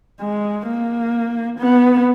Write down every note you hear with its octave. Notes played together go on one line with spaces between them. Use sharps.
G#3
A#3
B3